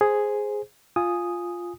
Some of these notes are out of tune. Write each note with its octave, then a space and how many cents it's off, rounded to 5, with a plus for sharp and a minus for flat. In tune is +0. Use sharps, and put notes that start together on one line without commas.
G#4 +0 C5 +0
F4 +0 G#5 +0 D#6 +0